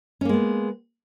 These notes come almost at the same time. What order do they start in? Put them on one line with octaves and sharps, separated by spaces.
C#4 A#3 G#3 B3